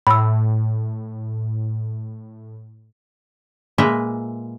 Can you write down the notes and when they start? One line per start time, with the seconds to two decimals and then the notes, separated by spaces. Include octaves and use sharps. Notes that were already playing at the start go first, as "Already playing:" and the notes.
0.07 A2 B5 E6
3.78 A#2 G#3 A#3 B4 E5 A#5